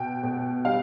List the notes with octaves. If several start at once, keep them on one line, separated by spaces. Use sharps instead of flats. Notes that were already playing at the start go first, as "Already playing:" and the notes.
Already playing: B2 G5
B2
G3 F5